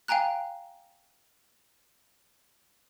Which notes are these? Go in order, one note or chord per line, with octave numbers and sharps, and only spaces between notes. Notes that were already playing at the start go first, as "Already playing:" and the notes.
F5 G5 G#5 A#5 F#6